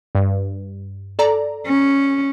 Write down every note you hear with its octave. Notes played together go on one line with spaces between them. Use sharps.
G2
A4 D5 A#5
C#4